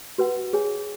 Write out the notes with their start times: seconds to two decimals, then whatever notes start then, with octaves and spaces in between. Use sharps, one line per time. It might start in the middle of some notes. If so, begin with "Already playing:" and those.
0.18 F#4 B4 F#5
0.53 G#4 C#5 G#5